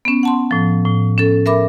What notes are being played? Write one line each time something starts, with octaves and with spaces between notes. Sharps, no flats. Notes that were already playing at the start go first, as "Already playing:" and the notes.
B3 C#4
F#5 A5 C6
A2 F3
A2
C#4 A4
A#4 E5 B5 D6